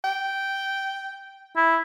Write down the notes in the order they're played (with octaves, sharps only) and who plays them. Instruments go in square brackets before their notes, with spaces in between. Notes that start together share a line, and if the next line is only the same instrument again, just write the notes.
[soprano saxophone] G5
[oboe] E4